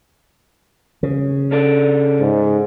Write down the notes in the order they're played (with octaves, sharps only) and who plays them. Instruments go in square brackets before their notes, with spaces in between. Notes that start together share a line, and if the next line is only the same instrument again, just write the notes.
[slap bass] C#3
[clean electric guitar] C#4 A4 D5
[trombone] G#2